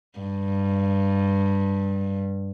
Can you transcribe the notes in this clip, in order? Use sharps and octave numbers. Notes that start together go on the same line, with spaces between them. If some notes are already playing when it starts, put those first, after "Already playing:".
G2